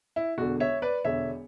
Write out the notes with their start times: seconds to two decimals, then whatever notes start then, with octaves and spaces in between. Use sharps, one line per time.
0.16 E4
0.38 E1 E2 D3 F#4
0.60 C#5 E5
0.82 B4 D5
1.04 E1 E2 D3 C#5 E5